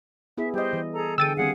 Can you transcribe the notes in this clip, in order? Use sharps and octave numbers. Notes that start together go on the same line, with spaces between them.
B3 E4 G#4 E5
G3 G4 C5 D#5
E3
G#4 A4 A#5
D3 G#4 A4 G5 E6 A6 D#7
D#3 G3 C4 G#4 F5 F#5